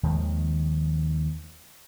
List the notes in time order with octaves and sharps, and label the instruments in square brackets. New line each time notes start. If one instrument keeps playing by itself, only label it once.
[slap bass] D#2 D#3 F3 G#3